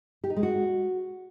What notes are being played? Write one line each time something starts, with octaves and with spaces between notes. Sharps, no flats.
G4
D#4
G#3
F#4